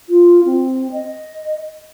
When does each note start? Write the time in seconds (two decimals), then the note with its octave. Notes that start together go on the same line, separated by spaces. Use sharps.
0.09 F4
0.45 C4
0.92 D#5